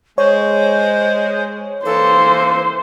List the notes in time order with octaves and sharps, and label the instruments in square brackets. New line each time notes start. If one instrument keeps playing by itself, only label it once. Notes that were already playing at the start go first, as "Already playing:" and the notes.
[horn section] G#3 [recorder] C5 [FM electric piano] C#5
[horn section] E3 A#3 [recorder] A4 [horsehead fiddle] C5